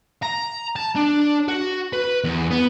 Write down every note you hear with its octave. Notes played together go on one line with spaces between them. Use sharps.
A#5
A5
D4
F#4
B4
E2
B3